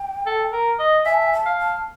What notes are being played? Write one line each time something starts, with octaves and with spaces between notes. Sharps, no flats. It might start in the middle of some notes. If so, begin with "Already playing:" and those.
Already playing: G5
A4
A#4
D#5
E5 G#5
A5
G#5
A5
F5
A5